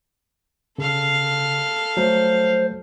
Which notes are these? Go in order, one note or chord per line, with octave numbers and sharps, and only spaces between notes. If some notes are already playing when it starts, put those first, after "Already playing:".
C#3 A4 F5
F#3 A3 C5